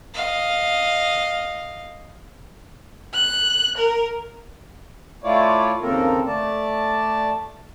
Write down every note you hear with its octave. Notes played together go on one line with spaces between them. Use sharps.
D#5 F5
F#6
A#4
A3 E4 F4 C#5 D5
D#2 C#3 A#3 C4 A4 A#4
A3 D5 A5